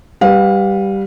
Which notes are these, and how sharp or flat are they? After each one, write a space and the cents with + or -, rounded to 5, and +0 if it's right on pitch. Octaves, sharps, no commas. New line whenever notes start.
G3 +0 B4 +0 F5 +30